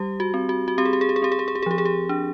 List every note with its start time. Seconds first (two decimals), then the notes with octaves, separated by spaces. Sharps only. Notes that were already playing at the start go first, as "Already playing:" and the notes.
Already playing: G3 G4
0.20 F#4
0.34 C4
0.49 F#4
0.68 F#4
0.78 C4 G4
0.85 G#4
0.93 G4
1.01 G#4
1.09 G4
1.16 G#4
1.22 C4 G4
1.32 G#4
1.39 G4
1.48 G#4
1.55 G4
1.62 G#4
1.66 F3 G4
1.78 G#4
1.85 G4
2.09 D4